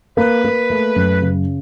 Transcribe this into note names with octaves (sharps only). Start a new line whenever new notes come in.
A#3 B4
A#3
A3
F#2
C#3